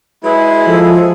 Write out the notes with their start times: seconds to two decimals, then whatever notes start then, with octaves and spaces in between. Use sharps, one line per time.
0.24 F#3 G#3 E4 G#4 B4
0.67 F3 A4